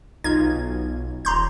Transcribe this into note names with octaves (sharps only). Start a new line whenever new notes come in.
B1 D#4 F4 G#6
D#1 A#5 C6 G6